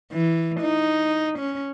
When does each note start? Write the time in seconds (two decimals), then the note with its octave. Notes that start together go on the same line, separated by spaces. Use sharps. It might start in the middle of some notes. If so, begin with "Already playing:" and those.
0.12 E3
0.61 D#4
1.39 C#4